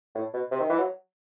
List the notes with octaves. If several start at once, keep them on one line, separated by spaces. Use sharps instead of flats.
A2
B2
C3
D#3
E3
F#3